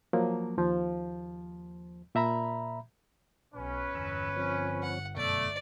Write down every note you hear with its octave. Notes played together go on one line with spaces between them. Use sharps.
F3 F#3 A#3
D#2 F3
A#2 E5 A#5 B5
B1 C#4 B4
G1 E2 A#5 E6
F3 C4 C#5
F#5
F#2 B2 A3 D5